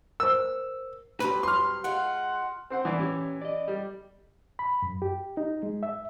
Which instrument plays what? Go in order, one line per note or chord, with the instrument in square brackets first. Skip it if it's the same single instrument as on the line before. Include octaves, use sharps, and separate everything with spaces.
[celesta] A#4 C5 [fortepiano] E6
[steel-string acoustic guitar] C3 F#3 G3 [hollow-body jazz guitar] B4
[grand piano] C6 F6
[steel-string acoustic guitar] G#3 F4 [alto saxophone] F#5
[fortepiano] C4 C5 F#5
[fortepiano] E3 [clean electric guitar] E4 B4 D5
[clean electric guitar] C#4 G4 C#5
D5 D#5
[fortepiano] G3
[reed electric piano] B5
F#2
G4
D#4
G#3
E5